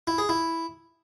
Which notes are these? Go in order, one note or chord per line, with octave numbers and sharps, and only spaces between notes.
E4
G#4
E4